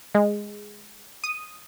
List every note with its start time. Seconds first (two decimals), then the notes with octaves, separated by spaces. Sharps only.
0.15 G#3
1.24 D#6